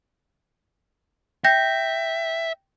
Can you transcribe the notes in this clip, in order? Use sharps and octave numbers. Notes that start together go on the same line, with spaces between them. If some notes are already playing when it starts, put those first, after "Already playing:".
E5 G5 G6 A#6